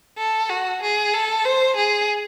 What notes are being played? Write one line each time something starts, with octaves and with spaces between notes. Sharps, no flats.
A4
F#4
G#4
A4
C5
G#4